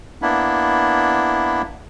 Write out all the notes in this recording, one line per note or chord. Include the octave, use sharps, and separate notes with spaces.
A#3 B3 D4 E4